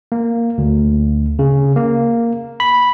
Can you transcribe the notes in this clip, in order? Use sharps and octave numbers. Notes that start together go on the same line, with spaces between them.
A#3
D2
C#3
A#3
B5